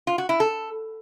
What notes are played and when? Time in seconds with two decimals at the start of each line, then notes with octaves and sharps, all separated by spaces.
0.07 F4
0.18 F#4
0.29 E4
0.40 A4